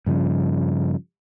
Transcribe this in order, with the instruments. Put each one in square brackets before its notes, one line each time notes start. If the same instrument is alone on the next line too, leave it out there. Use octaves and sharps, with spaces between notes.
[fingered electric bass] G2 C#3 F3